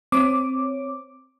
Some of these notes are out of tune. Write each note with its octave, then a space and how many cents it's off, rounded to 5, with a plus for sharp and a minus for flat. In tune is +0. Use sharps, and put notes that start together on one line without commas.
C4 +0 C#5 +0 D6 +0